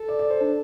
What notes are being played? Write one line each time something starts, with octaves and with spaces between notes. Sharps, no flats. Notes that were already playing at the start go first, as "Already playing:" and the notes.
Already playing: A4
D5
D5
C5
D4